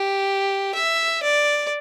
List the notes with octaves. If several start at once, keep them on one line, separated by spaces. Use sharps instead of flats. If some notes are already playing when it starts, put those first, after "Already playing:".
Already playing: G4
E5
D5